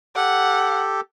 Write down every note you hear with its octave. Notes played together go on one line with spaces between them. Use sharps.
G4 A4 F#5